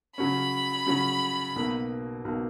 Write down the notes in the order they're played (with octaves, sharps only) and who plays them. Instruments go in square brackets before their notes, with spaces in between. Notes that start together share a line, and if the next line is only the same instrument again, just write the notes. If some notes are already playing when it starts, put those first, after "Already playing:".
[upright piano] C#3 F#3 C#4 [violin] B5
[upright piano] C#3 F#3 C#4
B1 B2 A#3
B1 B2 A#3